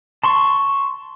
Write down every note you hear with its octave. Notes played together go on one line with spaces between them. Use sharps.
A5 C6 C#6